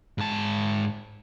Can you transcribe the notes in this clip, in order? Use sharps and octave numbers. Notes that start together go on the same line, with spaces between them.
G#2 A5